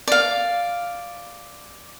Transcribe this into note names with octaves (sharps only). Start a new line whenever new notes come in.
D5 F5